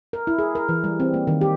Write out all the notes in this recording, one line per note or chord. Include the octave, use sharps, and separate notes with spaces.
A#4
E4
G#4
A#4
E3
G3
C4
A#3
D#3
G4